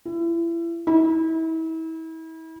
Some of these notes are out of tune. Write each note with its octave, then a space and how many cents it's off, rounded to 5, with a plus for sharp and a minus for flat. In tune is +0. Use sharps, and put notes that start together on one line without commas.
E4 +30
E4 -35